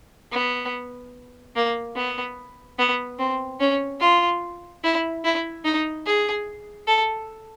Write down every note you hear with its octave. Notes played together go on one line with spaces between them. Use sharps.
B3
A#3
B3
B3
C4
C#4
F4
E4
E4
D#4
G#4
A4